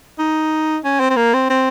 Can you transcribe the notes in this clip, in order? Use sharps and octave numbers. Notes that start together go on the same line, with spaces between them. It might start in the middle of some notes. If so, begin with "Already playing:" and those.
D#4
C#4
C4
C4
A#3
C4
C4